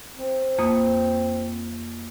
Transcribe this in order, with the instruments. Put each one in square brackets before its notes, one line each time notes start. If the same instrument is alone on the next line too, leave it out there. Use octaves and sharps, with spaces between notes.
[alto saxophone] C4
[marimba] F2 A#3 D#6